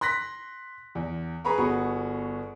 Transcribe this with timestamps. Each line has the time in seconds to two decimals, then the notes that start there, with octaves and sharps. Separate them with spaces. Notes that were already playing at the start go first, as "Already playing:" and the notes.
0.01 C6 F#6 A#6 B6
0.95 E2
1.45 G#4 B4 A#5 B5 C#6
1.58 G1 B3 F#4 G#4 C#6